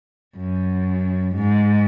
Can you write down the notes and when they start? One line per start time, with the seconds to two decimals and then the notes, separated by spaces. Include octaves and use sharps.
0.38 F#2
1.36 G#2